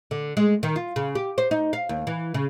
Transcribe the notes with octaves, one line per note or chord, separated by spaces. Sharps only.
D3
G#3
D#3
F4
C#3
G4
C5
D#4
F5
D#2
E3
C#3